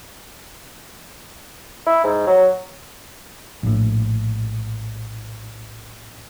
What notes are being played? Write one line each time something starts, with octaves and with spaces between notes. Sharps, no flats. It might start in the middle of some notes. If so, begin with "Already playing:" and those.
E4
G#2
F#3
A#1 A2